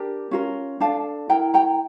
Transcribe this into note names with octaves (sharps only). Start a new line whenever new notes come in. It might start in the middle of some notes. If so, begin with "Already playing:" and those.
Already playing: D4 G4 A#4
C#4 F4 A#4
D4 A4 F5 A5
E4 A#4 G5 A#5
G5 A#5